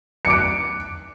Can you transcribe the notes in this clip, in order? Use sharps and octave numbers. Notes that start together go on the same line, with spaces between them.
D6 F#6 C#7 D7